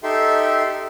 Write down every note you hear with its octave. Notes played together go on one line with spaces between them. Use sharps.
D#4 G4 A4 E5 C6